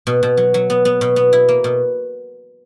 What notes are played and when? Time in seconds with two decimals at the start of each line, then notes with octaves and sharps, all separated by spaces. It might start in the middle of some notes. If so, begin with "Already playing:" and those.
0.07 B2
0.23 B2
0.37 F#3
0.54 F#3
0.70 B3
0.85 B3
1.01 B2
1.16 B3
1.33 E4
1.49 A#3
1.64 B2